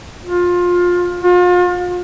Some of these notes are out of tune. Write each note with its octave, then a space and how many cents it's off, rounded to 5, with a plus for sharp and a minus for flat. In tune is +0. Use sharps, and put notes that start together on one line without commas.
F4 +20
F4 +40